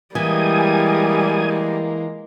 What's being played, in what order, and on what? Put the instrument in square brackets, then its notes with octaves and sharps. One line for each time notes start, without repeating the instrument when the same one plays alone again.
[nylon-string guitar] E3 [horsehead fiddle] G3 [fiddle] G#3 A#3 [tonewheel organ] G#5 D#6